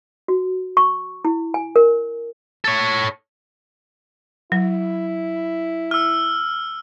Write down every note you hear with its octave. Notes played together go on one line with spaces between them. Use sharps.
F#4
C#6
E4
G#5
A#4
A4 C#5
F#3 E4
E6 F6